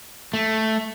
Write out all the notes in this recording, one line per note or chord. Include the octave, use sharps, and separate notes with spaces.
A3